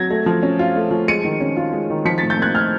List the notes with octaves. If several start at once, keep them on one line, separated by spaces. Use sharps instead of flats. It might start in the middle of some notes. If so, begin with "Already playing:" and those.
Already playing: F#3 G#6 A#6
A3
F3
C#4
F4
A3
F3
G#3 C#7 D#7
D#3
C#4
F4
G#3
D#3
F3 B6 C#7
A6 B6
A2
G6 A6
A#3 F#6 G#6
A2 F6 G6